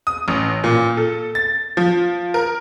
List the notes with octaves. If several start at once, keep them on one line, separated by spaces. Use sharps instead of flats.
D#6
A1
A#2
A4
A6
F3
A#4